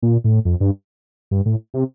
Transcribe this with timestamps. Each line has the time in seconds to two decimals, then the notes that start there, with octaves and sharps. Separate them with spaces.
0.02 A#2
0.24 A2
0.45 F2
0.60 G2
1.31 G2
1.46 A2
1.74 C3